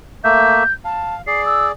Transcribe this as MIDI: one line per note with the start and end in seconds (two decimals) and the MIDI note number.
0.24 0.63 57
0.24 0.63 58
0.24 0.63 76
0.24 0.73 91
0.85 1.22 77
0.85 1.15 81
1.27 1.72 68
1.27 1.72 74
1.27 1.44 96
1.46 1.67 88